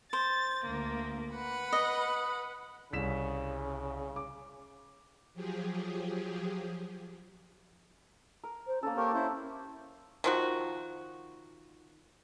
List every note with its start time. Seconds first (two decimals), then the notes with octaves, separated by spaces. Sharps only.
0.13 C5 A6
0.65 D2 A#3
1.34 B4 F#5 B5
1.72 D#5
2.93 C2 C#3 B6 E7
4.16 D6
5.34 F3 F#3 G4 G#4
8.44 A#4
8.67 C5
8.83 A#3 C#4 A4
8.97 A#3 G4 A#4 C#5 C#6
9.14 C#4 E4 C5
10.24 D#3 F3 F#4